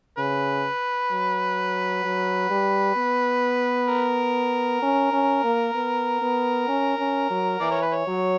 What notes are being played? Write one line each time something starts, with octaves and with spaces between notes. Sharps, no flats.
C#3 B4
F#3
F#3
G3
B3
A#4
C#4
C#4
A#3
B3
B3
C#4
C#4
F#3
E3 D5
C#5
B4
C#5
F#3